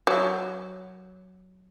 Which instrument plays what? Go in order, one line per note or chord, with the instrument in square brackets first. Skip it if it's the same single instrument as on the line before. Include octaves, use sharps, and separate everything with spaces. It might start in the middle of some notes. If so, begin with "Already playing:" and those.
[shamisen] F#3